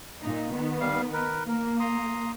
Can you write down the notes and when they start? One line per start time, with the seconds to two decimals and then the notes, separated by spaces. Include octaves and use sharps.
0.21 A#2 D#4
0.52 D#3 B3
0.81 G3 F5
1.13 A#4 B4
1.48 A#3 A#4
1.80 A#5 C6 D#6